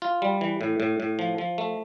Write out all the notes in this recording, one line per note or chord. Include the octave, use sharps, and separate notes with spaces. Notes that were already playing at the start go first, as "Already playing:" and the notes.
F4
G3
E3
A2
A2
A2
F3
F3
A3